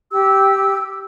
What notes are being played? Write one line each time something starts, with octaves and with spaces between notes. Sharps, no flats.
G4 E6